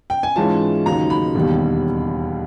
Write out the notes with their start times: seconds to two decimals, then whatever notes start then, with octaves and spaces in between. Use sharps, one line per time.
0.10 G5
0.23 G#5
0.36 G#2 E3 G#3 C#4 F4 A5
0.86 D#2 C#3 F#3 A#3 D#4 A#5
1.10 B5
1.35 E1 D#2 D#3 G3